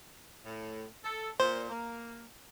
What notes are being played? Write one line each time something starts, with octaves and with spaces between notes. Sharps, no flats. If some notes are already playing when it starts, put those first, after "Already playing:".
A2
A4
A#2 C5
A#3